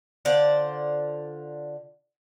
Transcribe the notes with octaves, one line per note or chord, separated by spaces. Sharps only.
D3 F4 C5 D5